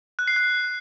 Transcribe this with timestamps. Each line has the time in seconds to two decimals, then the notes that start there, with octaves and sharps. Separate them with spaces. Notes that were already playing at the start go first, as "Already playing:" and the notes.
0.19 F#6
0.28 C7
0.36 F#6